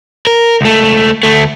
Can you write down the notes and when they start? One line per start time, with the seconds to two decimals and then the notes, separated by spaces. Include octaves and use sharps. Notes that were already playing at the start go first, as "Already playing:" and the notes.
0.27 A#4
0.61 C#2 A3
1.23 D2 A3